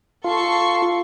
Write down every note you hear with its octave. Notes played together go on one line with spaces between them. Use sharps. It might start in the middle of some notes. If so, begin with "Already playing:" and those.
F4 A4 C#6 C7